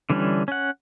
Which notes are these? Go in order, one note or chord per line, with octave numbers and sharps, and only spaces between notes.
D3 E3 G3 C#4 D4
C#4 F#5